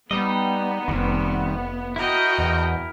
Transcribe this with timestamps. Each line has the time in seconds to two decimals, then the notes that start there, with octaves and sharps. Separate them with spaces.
0.11 G3 B3 D#4 D#5
0.88 F1 D#3 G3 C4
1.96 E4 F#4 A#4 D#5 G5
2.38 E2